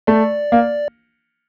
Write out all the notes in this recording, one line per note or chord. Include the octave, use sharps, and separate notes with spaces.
A3 D5
A#3